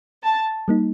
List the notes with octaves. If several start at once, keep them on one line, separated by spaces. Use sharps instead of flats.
A5
G3 A#3 D#4